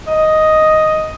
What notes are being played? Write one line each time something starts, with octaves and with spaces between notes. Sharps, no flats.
D#5